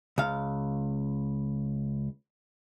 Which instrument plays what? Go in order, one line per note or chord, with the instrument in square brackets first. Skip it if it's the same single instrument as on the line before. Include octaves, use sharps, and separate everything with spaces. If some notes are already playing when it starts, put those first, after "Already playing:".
[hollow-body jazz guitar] C#2 F5